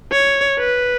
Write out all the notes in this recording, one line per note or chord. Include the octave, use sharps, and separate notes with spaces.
C#5
B4